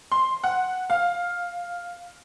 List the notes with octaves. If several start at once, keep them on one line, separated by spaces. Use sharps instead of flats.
C6
F#5
F5